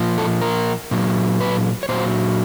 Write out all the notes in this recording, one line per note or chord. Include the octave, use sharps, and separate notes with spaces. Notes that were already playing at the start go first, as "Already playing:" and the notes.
Already playing: A#2 F3
A4
A#4
A#2 F#3
B4
C#5
A#2 F#3 C5